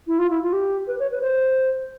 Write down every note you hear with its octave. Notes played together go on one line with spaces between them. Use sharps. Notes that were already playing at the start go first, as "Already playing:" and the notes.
E4
F4
E4
F4
G4
B4
C#5
B4
C5